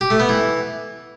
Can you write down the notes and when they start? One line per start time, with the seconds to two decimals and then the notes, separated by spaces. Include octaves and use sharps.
0.01 G4
0.10 A3
0.20 B3
0.29 E3